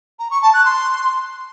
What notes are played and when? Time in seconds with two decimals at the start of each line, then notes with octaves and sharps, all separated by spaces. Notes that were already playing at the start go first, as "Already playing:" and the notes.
0.19 A#5
0.31 C#6
0.42 A5
0.54 F#6
0.65 C6